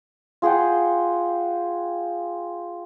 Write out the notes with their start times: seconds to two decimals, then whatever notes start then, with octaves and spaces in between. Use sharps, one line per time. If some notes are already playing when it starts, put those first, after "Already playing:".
0.42 F4 G#4 F#5 G5